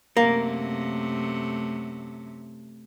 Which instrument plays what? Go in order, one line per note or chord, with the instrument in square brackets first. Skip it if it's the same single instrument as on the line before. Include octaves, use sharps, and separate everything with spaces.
[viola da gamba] F#2 C3 A3 [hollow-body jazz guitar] A#3